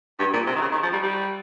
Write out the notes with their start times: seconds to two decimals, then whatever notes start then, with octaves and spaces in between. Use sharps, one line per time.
0.19 G2
0.33 A#2
0.47 C3
0.56 D#3
0.62 C#3
0.72 D#3
0.83 F3
0.93 G3
1.03 G3